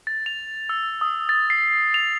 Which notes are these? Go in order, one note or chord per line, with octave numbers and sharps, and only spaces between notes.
A6
F7
E6
D#6
A6
C7
F7